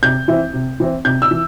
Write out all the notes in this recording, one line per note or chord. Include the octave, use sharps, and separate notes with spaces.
C3 G6
E3 C4 E4
C3
E3 C4 E4
C3 G6
E6
E3